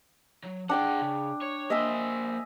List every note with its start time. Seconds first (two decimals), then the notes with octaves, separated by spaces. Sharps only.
0.44 F#3
0.69 D4 G#4 F#5 G5 D6
1.02 C#3
1.41 C#5
1.70 A#3 C5 D#5 E5 G#5